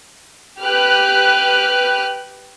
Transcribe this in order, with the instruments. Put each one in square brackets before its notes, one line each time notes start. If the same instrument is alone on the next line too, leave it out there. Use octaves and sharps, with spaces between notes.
[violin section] G4 B4 F6 F#6